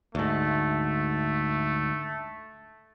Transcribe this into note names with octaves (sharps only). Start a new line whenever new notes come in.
D2 G#2 A3